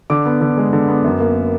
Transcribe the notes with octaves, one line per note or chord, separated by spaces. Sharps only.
D3 D6
B3
D3
G#3
D3
B3
F#2
A#3